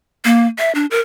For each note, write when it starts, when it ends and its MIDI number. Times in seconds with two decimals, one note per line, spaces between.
0.25 0.46 58
0.58 0.74 76
0.75 0.86 62
0.91 1.00 70